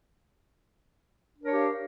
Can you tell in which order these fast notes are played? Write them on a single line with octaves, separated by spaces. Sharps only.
D4 A#4 C#5 G4 F5